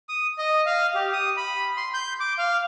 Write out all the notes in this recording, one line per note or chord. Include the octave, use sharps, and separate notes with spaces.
D#6
D#5
F5
G4
D#6
B5
C6
G6
D6
F5